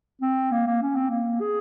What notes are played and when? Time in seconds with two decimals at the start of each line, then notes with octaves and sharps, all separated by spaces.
0.22 C4
0.52 A#3
0.67 A#3
0.82 C#4
0.96 C4
1.11 A#3
1.41 G#4